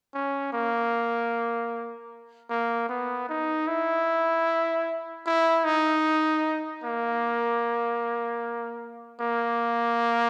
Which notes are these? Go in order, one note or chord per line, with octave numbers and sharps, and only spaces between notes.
C#4
A#3
A#3
B3
D#4
E4
E4
D#4
A#3
A#3